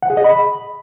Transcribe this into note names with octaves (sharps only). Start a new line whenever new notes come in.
F#5
G#4
D#5
B5